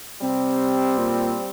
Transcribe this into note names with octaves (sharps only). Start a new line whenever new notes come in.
C3 G3 C4
A#2